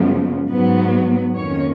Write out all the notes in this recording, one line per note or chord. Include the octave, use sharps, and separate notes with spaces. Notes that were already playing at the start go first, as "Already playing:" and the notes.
Already playing: F#2 C#3 F3 G#3 B3
G#2 F#3 B3
F2 D#3 A#3 C#4 C#5